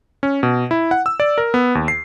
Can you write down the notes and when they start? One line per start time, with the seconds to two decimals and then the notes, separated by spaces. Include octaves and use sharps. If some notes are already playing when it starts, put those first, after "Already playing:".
0.23 C#4
0.43 B2
0.71 E4
0.91 F#5
1.06 E6
1.20 D5
1.38 A#4
1.54 B3
1.75 D#2
1.88 C7